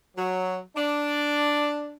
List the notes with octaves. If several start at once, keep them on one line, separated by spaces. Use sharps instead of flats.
F#3
D4